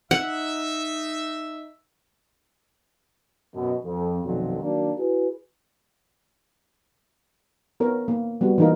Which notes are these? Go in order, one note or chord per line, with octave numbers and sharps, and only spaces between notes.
D#4 E5 F#5
F#2 B2
F2
B1 F2 A#2 D#3 F3 F#3
D#3 F#3 A#3 D4
E4 F#4 G#4 B4
B3 A#4 C#5
A#3
G3 B3 F#4
E3 A#3 D#4 F4 A#4